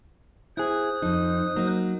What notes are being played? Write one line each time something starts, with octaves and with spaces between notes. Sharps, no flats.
E4 G#4 C5 D#6 F#6
F2 F3 D#4
F#3 A#3 D#4